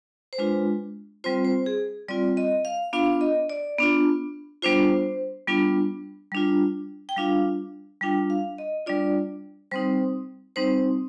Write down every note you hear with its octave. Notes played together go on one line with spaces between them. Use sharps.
C5
G#3 D4 F4 B4
G3 C4 F4 C5
C5
G#4
G3 C4 F4 D5
D#5
F5
B3 D4 F4 F5
D#5
D5
B3 D4 F4
G3 B3 D4 F4 C5
G3 B3 D4 F4
G3 D4 F4
G5
G3 D4 F4 F5
G3 D4 F4 G5
F5
D#5
G3 D4 F4 D5
G3 C4 D#4 C5
G3 C4 D#4 C5